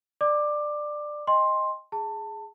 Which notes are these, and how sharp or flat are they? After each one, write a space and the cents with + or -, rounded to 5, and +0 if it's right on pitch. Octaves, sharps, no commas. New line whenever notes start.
D5 +15 D6 +15
D#5 +0 G5 +45 C6 +10
G#4 +0 A5 +20